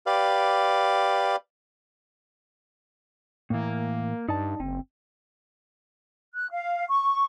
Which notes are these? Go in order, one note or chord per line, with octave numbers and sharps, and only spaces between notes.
G4 B4 D5 F5
A2 E3 A#3
G2 D#4 D5 A5
F#1 C4
F#6
F5
C#6